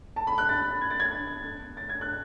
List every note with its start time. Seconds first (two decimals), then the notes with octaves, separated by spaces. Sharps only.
0.16 A5
0.27 B5
0.38 F#6
0.49 A6
0.81 G#6
0.90 A6
1.00 G#6
1.77 A6
1.89 G#6
2.01 F#6